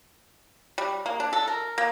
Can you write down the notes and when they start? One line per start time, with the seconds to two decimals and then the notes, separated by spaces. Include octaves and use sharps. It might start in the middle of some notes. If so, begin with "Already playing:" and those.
0.78 G3
1.06 A#3
1.20 D4
1.33 A4
1.48 A#4
1.78 A#3